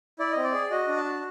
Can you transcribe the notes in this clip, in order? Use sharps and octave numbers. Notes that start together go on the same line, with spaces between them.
E4 D5
C4 D#5
D5
G#4
F#4 D#5
D4
A5
F#4